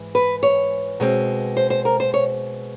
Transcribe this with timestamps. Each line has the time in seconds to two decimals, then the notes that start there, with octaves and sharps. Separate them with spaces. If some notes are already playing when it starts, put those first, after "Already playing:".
Already playing: G#2 E3
0.15 B4
0.43 C#5
1.00 B2 G#3 C4
1.57 C5
1.70 C5
1.85 A#4
2.00 C5
2.14 C#5